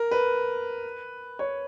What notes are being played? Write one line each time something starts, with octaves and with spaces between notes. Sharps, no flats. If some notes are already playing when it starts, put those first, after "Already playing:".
Already playing: A#4
B4
C#5